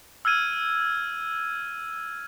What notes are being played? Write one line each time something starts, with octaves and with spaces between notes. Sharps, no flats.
E6 F6 G#6 D#7